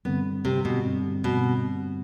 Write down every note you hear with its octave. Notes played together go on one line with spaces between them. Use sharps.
G2 D3 G3 B3 C4
C3
B2
G2 D3 G3 C4
B2